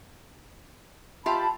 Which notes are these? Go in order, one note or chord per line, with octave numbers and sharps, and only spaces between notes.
F4 G4 E5 A5 B5